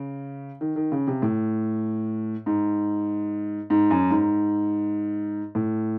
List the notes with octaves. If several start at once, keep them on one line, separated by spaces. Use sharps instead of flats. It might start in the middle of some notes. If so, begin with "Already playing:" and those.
Already playing: C#3
D#3
D#3
C#3
C3
A2
G#2
G#2
F#2
G#2
A2